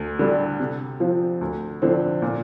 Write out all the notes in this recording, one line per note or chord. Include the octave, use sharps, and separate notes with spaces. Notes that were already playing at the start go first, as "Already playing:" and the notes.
Already playing: D2
D3 G3
C3
F3 C4 F4
D2
D3 F3 C4
A#2